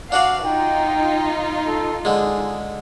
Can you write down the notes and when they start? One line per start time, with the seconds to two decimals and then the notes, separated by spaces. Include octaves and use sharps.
0.12 D4 F#4 D5 F5 F#5
0.45 D#4 F4 G5
1.67 A4
2.05 D3 G#3 G#4